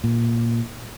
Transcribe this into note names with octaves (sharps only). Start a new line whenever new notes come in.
A#2